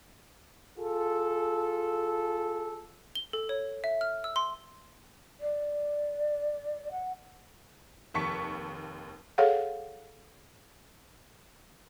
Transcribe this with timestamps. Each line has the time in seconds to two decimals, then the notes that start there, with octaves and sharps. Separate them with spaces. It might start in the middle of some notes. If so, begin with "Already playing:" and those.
0.79 F4 G#4 A4
3.15 G7
3.33 A4
3.49 C#5
3.84 E5
4.01 F6
4.24 E6
4.36 C6
5.40 D5
6.91 F#5
8.14 F1 D#2 A5 C#6 B6 C#7
9.38 G#4 A4 C#5 F5 F#5